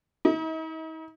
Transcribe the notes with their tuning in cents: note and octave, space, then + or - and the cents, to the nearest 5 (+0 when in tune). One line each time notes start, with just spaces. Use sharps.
D#4 +45